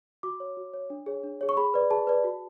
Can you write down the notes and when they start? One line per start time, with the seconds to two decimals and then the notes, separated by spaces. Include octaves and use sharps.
0.23 F#4 D6
0.40 C#5
0.57 F#4
0.74 C#5
0.90 D4
1.06 G#4 C#5
1.24 D4
1.41 G#4 C#5
1.49 C#6
1.57 G#4 B5
1.74 B4 D5
1.90 G#4 A5
2.07 B4 D5
2.24 F#4